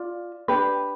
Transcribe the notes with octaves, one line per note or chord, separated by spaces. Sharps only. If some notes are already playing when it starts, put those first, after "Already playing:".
Already playing: F4 D5
D4 G4 B4